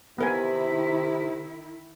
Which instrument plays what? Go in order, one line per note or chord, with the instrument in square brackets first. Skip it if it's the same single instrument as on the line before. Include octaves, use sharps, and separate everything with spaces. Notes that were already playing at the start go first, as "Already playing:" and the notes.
[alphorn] C3 [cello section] D#3 E4 [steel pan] B3 A#4 G#5